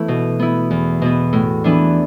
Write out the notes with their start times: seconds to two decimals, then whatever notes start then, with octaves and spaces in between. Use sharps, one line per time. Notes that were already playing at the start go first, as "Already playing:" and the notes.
Already playing: E3 A3 B3 E4
0.08 B2
0.39 B3 E4
0.71 E2
1.02 B2 B3
1.33 A2
1.64 E3 B3 D4